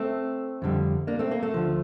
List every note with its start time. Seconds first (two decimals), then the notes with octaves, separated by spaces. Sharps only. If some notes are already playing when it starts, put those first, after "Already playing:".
Already playing: A3 C4
0.62 F2 D3 G3
1.07 A#3 D4
1.19 A3 C4
1.31 A#3
1.43 A3
1.54 D2 D3 F3